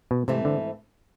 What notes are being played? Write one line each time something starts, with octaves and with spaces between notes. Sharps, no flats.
B2
G#2 C3 E3 A3 C4
D3